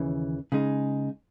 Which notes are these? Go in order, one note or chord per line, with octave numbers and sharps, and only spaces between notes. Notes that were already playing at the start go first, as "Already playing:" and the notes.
Already playing: D#2 C#3 E3
C#3 G#3 D#4 G#4